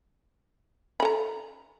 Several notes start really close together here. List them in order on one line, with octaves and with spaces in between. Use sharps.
B5 A4 A#5